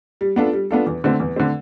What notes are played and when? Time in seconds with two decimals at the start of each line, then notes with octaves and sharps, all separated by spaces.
0.21 G3
0.36 B3 D4 F4 A4
0.53 G3
0.71 B3 D4 F4 A4
0.86 E2
1.04 D3 A3 C4
1.20 E2
1.36 D3 A3 C4